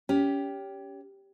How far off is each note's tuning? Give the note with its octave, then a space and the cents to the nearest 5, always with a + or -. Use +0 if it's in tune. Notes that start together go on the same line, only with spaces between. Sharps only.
C#4 +25 G4 +0